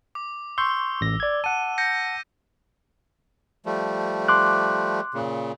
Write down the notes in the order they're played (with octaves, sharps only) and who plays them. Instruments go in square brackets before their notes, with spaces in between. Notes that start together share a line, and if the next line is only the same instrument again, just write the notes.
[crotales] D6
[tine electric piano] C6 C#6 G6 [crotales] E6
[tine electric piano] A1 A#6
D5 G#6
[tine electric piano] F#5 A5 [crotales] D#7
[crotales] G6 A#6 C#7
[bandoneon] F3 G3 A3
[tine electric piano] C6 D6 F#6
[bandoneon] A#2 C#3